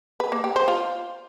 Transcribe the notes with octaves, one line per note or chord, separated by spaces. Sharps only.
B4
A#3
G4
C5
F4